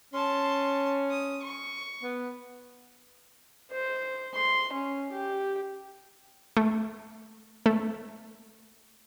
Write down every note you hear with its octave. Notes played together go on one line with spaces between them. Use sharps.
C#4 A5 C6
D#6
C#6
B3
C5
C6
C#4
G4
A3
A3